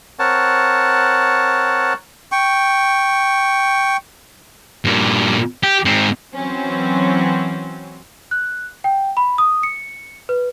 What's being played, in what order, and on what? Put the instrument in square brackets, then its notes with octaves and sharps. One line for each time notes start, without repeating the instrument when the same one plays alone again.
[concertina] C4 A#4 C#5 F#5 A5
[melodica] G5 C#6
[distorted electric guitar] G2 A#2
G4
G#2 C4
[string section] E3 F#3 C4 C#4
[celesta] F#6
G5
B5
D#6
C#7
B4